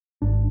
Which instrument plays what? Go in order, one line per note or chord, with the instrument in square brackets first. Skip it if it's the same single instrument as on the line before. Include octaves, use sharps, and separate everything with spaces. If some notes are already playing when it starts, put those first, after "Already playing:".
[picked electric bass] G#1 D4